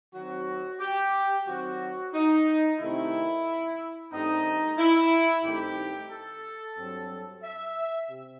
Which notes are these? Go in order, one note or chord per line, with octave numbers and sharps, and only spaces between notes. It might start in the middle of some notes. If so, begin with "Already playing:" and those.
D#3 F#3 C4 F#4
G4
D#3 F#3 C4 F#4
D#4
C3 D#3 A3 C4 E4
G2 D#3 A3 C4 D#4
E4
G2 D#3 A3 C4 G4
A4
G2 F#3 C4
E5
C3